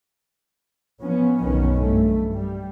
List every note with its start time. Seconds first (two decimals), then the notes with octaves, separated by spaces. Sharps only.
1.02 F3 B3 C#4
1.42 F#1 B1 B2 D#3 B3 C#4
1.80 G2 A3
2.34 G3